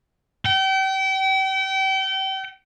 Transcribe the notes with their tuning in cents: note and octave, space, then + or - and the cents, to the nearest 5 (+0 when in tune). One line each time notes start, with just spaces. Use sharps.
G5 -35